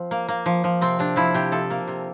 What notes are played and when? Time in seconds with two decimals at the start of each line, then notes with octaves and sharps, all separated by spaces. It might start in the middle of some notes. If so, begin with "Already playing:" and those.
Already playing: F3 C4
0.11 A#3
0.28 A#3
0.46 F3
0.64 F3
0.81 C3 C4
0.99 C3 D4
1.16 F3 E4
1.34 C3 G4
1.52 F3 A4
1.70 A#3
1.88 C3